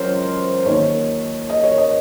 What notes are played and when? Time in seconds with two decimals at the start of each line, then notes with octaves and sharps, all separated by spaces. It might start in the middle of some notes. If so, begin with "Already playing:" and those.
Already playing: C#2 F#3 C#4 A#4 C5 C#5
0.65 D#2 D#3 A#3 C#5
1.50 D#5
1.64 C#5
1.78 D#5